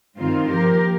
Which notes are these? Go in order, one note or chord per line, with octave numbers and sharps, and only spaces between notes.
G2 D#3 C4 F4
F3 A#3 G4 A#4